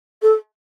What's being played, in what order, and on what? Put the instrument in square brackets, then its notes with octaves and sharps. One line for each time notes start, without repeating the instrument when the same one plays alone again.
[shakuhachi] A4